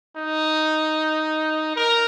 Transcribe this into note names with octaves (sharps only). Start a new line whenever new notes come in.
D#4
A#4